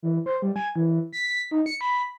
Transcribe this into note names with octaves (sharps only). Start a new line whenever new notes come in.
E3
C5
G3
G#5
E3
B6
D#4
C#7
B5